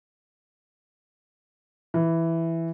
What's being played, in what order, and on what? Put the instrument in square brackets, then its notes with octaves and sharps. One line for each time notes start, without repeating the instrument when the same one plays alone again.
[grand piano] E3